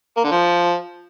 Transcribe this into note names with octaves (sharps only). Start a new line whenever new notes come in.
A#3
D3
F3